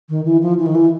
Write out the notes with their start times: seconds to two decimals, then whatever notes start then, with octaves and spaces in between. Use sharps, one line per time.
0.09 D#3
0.25 E3
0.42 F3
0.59 E3
0.66 D#3
0.75 E3